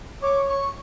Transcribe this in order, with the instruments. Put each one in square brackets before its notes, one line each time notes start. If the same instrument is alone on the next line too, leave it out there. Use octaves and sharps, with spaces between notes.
[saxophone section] C#5 [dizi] D6
[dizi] C#6